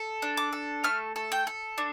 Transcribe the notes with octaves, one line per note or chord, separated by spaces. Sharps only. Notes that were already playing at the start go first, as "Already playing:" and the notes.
Already playing: A4
D4
D6
A4
A3 F6
A4
G5
A4
D4